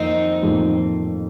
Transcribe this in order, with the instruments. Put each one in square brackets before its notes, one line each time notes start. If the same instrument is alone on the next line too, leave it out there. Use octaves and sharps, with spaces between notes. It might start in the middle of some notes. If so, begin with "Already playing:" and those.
Already playing: [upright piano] F2 D#3 A#3 [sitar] C4 D#4
[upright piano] F2 D#3 A#3